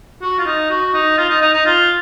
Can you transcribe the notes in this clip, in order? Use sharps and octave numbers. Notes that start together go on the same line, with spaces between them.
F#4
F4
D#4
F#4
D#4
F4
D#4
D#4
D#4
F4